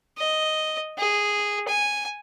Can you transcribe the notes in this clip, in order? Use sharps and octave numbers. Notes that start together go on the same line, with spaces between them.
D#5
G#4
G#5